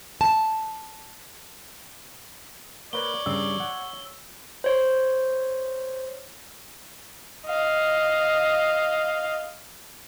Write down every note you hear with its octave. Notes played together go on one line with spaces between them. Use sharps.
A5
A#3 B4 C#5 D5 G7
G2 C#3 G3 E6
F#5
C5 C#5
D#5 F5